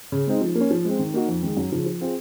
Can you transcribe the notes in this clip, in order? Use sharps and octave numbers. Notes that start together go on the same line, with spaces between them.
C#3
G#3 C4 D#4
F3
A#3
C#4
F3
G#3 C4
D#3
A#3 D#4 F#4
F2
D#3 G#3
F#2
C#3 F3
F3
C4 F4 G#4